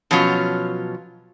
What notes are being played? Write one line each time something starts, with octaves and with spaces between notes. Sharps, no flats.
B2 F3 F#3 C#4 F4